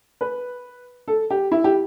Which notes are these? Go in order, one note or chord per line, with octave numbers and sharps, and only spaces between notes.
B4
A4
G4
E4
G4